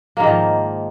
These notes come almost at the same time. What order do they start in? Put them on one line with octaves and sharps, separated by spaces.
A#3 G#2 D#3 F3